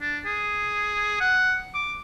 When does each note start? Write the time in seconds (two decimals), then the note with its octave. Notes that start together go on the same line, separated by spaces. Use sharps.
0.01 D4
0.26 G#4
1.21 F#5
1.74 D6